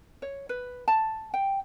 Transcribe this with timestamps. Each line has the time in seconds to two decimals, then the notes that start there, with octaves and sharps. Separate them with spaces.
0.22 C#5
0.49 B4
0.88 A5
1.34 G5